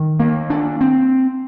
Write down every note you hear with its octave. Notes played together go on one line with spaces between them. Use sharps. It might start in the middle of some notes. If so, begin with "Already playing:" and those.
Already playing: D#3
A#3
D4
C4